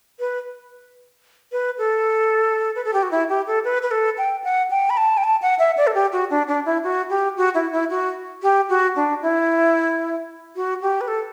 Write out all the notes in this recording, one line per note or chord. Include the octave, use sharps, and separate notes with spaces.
B4
B4
A4
B4
A4
G4
F#4
E4
G4
A4
B4
B4
A4
G5
F#5
G5
B5
A5
G5
A5
F#5
E5
D5
A4
G4
F#4
D4
D4
E4
F#4
G4
F#4
E4
E4
F#4
G4
F#4
D4
E4
F#4
G4
B4
A4